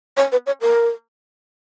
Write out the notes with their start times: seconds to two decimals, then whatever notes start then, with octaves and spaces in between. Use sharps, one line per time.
0.17 C#5
0.32 B4
0.47 C#5
0.61 A#4